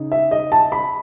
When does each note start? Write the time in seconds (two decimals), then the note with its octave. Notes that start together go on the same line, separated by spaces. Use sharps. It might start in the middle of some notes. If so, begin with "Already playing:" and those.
Already playing: C#3 D#4
0.12 E5
0.31 D#5
0.52 A5
0.72 B5